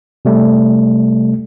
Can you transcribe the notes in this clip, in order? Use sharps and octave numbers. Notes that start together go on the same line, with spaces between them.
C3 G3 A3